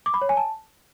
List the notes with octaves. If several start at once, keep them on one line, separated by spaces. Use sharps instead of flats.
D6
B5
C#5
G#5
A5